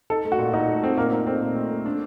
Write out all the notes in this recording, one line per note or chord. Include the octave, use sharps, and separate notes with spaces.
D#4 A4
A3
F#4
A#2
A#2 D#4
A3
A3 C4
A#2 A#3
A#3 D#4
A3 C4
A#2
A3
A3
D4